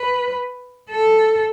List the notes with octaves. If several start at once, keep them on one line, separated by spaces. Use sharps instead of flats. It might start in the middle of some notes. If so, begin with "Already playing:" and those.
Already playing: B4
A4